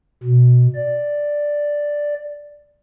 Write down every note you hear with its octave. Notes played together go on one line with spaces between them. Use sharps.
B2
D5